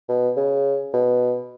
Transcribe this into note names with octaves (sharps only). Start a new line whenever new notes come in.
B2
C#3
B2